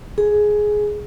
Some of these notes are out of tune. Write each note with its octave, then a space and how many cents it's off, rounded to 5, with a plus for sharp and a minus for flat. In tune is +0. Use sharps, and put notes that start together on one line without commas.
G#4 +10